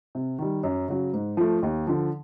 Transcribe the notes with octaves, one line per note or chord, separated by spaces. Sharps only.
C3
D#3 G3
F#2
C#3 F#3
G#2
F3 A3
D#2
D3 F3